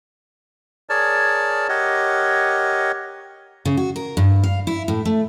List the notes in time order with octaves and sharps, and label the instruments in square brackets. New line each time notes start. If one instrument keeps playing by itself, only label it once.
[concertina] G#4 A#4 C#5 D5 A5
G4 A#4 C#5 D#5 F#5
[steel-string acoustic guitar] C#3
F#4
A#4
G2
F5
E4
A2
A3